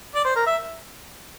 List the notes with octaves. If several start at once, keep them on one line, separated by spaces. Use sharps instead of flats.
D5
C5
A#4
E5